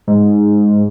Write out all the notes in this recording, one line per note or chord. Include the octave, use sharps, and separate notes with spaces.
G#2